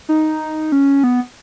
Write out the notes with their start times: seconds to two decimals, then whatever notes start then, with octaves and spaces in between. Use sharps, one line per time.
0.09 D#4
0.72 C#4
1.04 B3